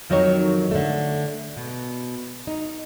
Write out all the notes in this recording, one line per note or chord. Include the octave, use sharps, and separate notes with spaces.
F2 D#3 F#3 D#4 A#4 C#5
D3 A3
B2
D#4